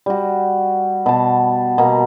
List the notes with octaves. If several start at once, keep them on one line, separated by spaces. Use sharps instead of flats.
G3 F#4
B2 A5
B2 A#3